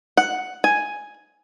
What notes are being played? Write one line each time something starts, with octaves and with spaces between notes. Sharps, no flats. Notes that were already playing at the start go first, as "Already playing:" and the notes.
F#5
G#5